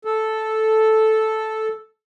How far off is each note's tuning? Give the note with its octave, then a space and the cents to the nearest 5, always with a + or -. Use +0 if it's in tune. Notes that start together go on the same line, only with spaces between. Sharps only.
A4 -5